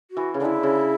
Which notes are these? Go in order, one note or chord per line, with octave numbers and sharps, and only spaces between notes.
F#4
E3
C#3
D3 D4
E4
C#3